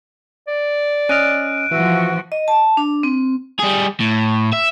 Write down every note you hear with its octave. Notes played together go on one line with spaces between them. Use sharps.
D5
C#4 D#5 F6 F#6 D7 D#7
E3 F3 F#4 E5
D#5
A5
D4
C4
G3 G#4
A2
E5